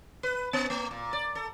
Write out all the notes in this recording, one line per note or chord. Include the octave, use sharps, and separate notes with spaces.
B4
B3
A#3
A#2
D5
A4